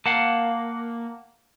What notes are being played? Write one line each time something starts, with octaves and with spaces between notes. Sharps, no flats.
A#3 F5 F#5 A5